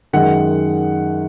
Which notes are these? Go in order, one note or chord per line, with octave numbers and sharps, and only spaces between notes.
F#2 D#3 G#3 F#5